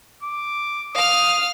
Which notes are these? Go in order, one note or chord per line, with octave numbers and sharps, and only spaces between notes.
D6
F5 D#6 F6